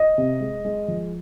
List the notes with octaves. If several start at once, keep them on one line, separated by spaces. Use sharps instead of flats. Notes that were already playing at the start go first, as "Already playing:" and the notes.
Already playing: D#5
C3
G#3
G#3
F3